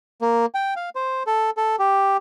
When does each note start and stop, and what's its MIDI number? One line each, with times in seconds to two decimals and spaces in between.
0.21 0.46 58
0.55 0.74 79
0.76 0.89 77
0.95 1.23 72
1.27 1.50 69
1.57 1.76 69
1.79 2.17 67